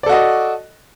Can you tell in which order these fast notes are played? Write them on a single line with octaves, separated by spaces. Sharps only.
D5 A4 F#4 D#5